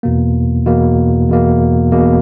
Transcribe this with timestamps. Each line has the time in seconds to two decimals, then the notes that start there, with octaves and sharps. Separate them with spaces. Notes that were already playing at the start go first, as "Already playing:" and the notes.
0.03 E2 B2 A#3
0.65 E2 B2 A#3
1.29 E2 B2 A#3
1.92 E2 B2 A#3